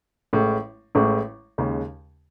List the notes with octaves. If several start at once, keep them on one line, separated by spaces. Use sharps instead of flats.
A1 A2 G#3
A1 A2 G#3
D#2 C#3 G#3